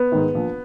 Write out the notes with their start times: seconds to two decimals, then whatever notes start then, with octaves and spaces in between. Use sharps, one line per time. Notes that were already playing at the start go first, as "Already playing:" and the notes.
Already playing: B3
0.12 G#2 D#3
0.35 A#1